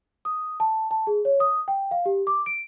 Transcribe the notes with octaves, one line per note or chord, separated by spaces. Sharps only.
D#6
A5
A5
G#4
C#5
D#6
G5
F5
G4
D6
D7